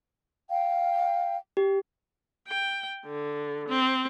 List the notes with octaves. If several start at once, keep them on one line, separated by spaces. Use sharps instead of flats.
F5 G5
G4
G5
D3
C4